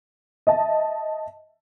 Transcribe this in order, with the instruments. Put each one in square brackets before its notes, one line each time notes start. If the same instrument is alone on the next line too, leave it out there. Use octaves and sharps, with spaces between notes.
[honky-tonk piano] D#5 E5 A5